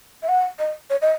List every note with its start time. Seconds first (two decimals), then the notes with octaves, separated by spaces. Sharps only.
0.22 E5
0.28 F#5
0.59 D#5
0.90 C#5
1.01 D#5